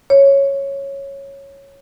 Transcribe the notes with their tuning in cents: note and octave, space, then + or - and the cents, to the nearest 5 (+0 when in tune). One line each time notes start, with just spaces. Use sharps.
C#5 -5